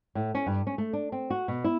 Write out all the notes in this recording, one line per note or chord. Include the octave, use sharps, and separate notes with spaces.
A2
C#4
G2
C#4
A3
D4
C4
F#4
B2
E4